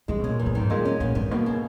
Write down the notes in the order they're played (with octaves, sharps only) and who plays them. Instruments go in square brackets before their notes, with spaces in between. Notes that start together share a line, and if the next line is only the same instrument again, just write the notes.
[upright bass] C#3 [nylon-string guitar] G#3
[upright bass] B2
[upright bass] A#2 [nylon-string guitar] C#4
[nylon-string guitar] E2
[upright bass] F#2
[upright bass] G#2 [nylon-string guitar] D#3
[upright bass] A#2 [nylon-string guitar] G#3
[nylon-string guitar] C#4
[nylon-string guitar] E2 [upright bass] A#2
[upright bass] G#2 [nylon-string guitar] D#3
[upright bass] B2 [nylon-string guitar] A#3
[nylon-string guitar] C#3